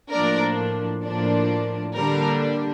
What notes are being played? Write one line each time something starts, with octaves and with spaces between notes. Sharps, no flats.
A2 F3 A#3 D4 A#4 D5
A2 F3 A#3 D4
D3 G3 A#3 D4 A#4